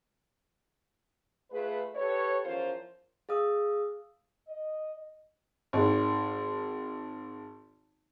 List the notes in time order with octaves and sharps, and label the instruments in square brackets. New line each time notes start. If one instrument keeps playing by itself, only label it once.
[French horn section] A3 F4 G#4 B4
G4 A4 B4 C#5
E2 F3 C#4 F4 A#4 C5
[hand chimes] G#4 F5 D#6 E6
[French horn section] D#5
[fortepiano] G#1 D#3